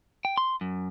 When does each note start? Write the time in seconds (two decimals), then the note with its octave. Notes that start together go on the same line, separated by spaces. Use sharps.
0.25 G5
0.38 C6
0.61 F#2